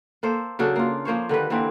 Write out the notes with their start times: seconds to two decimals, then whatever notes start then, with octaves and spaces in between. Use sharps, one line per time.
0.23 A#3 A4 C5
0.59 C#3 F#3 D4 A4
0.76 A#3 F4
1.05 F3 A#3 C5 C#5
1.29 D3 D#3 G3 B4
1.50 D3 E3 A#3 C4